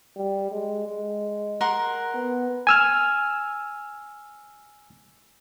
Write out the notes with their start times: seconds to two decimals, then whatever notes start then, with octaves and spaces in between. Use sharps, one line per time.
0.16 G3
0.51 G#3
0.87 G#3
1.61 A#4 F#5 C6
2.14 B3
2.67 G#5 E6 F6